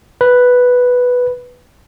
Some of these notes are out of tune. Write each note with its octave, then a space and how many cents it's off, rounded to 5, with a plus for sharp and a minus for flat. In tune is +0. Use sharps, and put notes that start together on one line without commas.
B4 +0